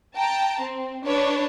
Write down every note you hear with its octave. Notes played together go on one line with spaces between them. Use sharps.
G5 A5 A#5
C4
D4 B4 C#5